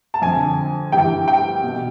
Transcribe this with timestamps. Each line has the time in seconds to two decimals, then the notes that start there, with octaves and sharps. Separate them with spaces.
0.14 A5
0.22 F2 D3 G#5
0.92 G2 E3 G5
1.28 G5
1.63 B2